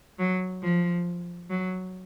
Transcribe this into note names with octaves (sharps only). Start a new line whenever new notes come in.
F#3
F3
F#3